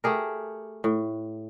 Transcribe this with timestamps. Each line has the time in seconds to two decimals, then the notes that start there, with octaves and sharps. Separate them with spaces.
0.04 A3 G4 G#4 A#4
0.84 A2